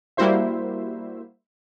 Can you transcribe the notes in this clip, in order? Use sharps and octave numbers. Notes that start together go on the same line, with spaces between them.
G3 A#3 E4 F#4 C5 E5